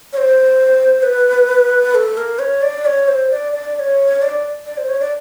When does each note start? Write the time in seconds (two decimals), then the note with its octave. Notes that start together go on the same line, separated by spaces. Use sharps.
0.13 C#5
0.17 C5
1.03 B4
1.95 A4
2.17 A#4
2.39 C#5
2.62 D5
2.86 C#5
3.08 C5
3.31 D5
3.52 D5
3.76 D5
3.79 C#5
4.22 D5
4.66 D5
4.78 C5
4.89 C#5
5.00 D5